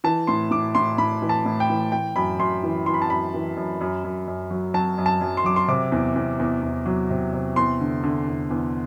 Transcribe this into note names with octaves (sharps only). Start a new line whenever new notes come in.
E3 A5
A2 C6
A2 D6
A2 C6
A2 B5
E3
A5
A2
G5
E3
E3 G5
F#2 B5
F#2 C6
E3
E3 C6
B5
A5
F#2 B5
E3
F#2
F#2
F#2
F#2
F#3
F#3 A5
F#2
A5
F#2
C6
F#3 D6
C6
C3 D6
E2
E2
E2
E2
F#3
C3
C3
E2 C6
D3
D3
E2
E2